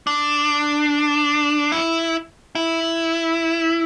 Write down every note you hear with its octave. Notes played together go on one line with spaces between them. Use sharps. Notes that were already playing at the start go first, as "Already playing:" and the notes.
D4
E4
E4